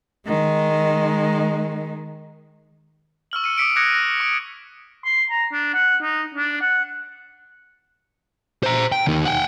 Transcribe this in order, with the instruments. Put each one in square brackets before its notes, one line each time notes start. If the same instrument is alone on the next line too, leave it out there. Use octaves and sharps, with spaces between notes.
[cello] D#3 G#3
[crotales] C#6 E6 F6 F#7
C#7 D#7
D6 D#6 B6 C#7 D7
D6 D#6 F#6 G#6 A#6 C#7
A#6 D#7
C#6 D7
[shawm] C6
A#5
D4
F#5
D#4
D4
F#5
[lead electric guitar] C5 A#5
G5
D#2 D#3
F#5 G5